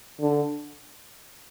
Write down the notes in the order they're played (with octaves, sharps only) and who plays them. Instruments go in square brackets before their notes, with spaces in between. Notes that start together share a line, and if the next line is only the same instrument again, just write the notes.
[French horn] D3